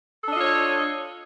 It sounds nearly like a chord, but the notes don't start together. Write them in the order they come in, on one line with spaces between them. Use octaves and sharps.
A4 D4 D#5 F4 C#5